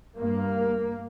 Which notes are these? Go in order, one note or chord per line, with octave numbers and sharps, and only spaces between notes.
G2 A#3